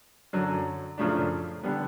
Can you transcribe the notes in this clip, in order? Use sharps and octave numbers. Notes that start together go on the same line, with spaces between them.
F#2 D3 F#3
F#2 C#3 F3 A3 D4
D3 G3 B3